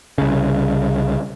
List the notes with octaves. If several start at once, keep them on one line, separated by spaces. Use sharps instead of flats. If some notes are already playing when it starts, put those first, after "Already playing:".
C2 C#3